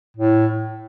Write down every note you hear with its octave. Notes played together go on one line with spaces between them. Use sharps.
A2